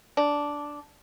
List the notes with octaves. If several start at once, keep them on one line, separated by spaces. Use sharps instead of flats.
D4